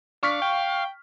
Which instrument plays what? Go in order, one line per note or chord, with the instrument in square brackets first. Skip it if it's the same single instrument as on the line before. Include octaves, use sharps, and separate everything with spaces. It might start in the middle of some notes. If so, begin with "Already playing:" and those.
[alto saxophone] D4 [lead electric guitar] F5 [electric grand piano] C#6 F6 B6
[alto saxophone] G5